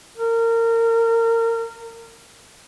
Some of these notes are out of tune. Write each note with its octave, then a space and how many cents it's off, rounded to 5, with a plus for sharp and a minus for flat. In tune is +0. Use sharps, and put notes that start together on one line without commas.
A#4 -25